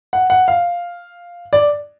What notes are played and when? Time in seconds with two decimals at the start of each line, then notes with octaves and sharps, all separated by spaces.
0.13 F#5
0.30 F#5
0.48 F5
1.53 D5